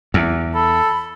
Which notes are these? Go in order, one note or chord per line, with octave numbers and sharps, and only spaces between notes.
E2
A4 B5